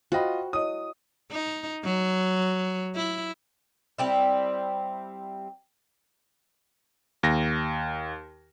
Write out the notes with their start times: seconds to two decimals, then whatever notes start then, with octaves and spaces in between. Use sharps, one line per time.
0.12 F4 F#4 C5 D#5 G5 B5
0.53 E4 C#5 D#5 D#6 D#7
1.31 D#4
1.85 F#3
2.95 E4
3.98 G3 C4 E4
7.23 D#2 A#6